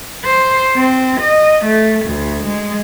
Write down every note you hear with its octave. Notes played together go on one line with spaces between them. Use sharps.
C5
C4
D#5
A3
D2
G#3